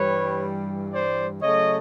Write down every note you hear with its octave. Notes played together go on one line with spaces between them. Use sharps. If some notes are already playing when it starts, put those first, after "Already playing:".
Already playing: G2 E3 G3 B4 C#5
C5 D5
C#3 F#3 A3 C#5 D#5